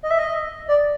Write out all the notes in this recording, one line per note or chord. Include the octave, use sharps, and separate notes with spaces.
D#5
E5
D#5
D5